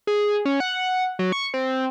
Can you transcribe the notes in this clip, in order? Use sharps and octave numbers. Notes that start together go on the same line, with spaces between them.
G#4
C#4
F#5
F#3
C#6
C4